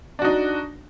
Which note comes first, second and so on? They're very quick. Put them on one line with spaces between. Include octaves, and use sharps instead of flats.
D4 F#4 D#4